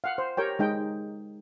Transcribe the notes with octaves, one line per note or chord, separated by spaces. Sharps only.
F5 F#5
C5
G4 A#4 C#5 G5
G#3 D#4 G5